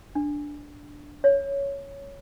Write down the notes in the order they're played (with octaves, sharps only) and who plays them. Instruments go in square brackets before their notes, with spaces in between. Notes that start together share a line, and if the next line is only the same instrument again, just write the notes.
[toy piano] D4
C#5